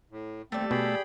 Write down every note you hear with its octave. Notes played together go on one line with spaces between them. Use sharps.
A2
D#2 G3 A3 C4 D5
B2 G#4 G5 B5